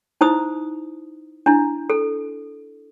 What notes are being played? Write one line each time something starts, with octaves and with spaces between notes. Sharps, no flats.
D#4 E4 C5 D#6
D4 E4
A4